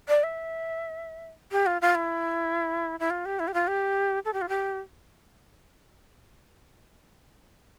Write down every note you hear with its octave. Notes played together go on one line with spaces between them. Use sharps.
D5
E5
G4
F4
F4
E4
E4
F4
G4
E4
G4
F4
G4
A4
G4
F4
G4